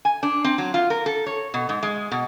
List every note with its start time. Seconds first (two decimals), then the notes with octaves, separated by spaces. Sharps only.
0.05 G#5
0.23 D4
0.44 C4
0.58 F#3
0.74 F4
0.90 A#4
1.06 A4
1.26 C#5
1.54 B2
1.69 G#2
1.83 G#3
2.12 B2